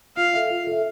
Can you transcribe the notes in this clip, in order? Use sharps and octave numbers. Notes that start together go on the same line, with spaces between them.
F4 F5
A4 E5
F4
A4 E5